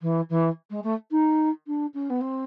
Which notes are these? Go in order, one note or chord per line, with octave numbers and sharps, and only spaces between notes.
E3
E3
G#3
A3
D#4
D4
C#4
B3
C4